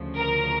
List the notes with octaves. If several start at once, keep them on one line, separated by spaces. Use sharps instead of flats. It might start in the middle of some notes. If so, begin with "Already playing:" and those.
Already playing: D2 C#3 F3
A#4